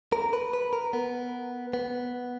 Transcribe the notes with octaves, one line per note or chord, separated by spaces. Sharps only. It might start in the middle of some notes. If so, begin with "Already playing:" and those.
A#4
B4
B4
A#4
B3
B3